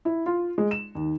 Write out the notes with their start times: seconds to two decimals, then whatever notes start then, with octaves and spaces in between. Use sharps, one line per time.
0.05 E4
0.26 F4
0.58 G#3
0.71 E7
0.95 D#2